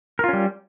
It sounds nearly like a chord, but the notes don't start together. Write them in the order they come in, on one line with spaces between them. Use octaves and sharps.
A#4 F4 C#4 G3